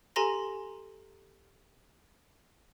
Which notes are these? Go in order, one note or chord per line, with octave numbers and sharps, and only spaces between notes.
G4 A4 G#5 A#5 C6 A#6